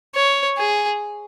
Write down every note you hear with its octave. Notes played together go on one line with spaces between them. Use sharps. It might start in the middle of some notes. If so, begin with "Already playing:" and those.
C#5
G#4